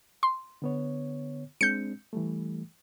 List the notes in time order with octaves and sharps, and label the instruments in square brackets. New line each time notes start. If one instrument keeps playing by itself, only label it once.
[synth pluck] C6
[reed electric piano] D3 B3 C#5
[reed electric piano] G#3 C4 D4 [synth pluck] G6 C#7
[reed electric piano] E3 G3 A3